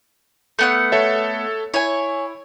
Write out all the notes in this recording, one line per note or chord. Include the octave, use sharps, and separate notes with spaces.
A3 B3 F#5
A4 C#5 E5
E4 C#5 G#5